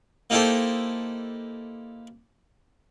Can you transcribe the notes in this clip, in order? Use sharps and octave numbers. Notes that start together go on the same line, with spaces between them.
A#3 D#4 E4 G4 A4 C5